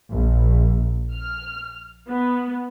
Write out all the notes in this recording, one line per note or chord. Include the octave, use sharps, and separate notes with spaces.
A#1
F6
B3